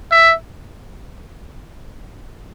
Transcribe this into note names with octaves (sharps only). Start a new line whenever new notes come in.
E5